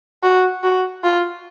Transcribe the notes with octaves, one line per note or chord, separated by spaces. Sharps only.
F#4
F#4
F4